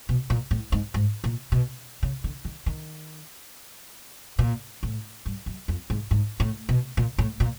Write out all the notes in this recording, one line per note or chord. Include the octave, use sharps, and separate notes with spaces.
B2
A#2
A2
G#2
G#2
A#2
B2
C#3
D3
D#3
D#3
A#2
A2
G2
F#2
F2
G#2
G#2
A2
B2
A#2
A2
A#2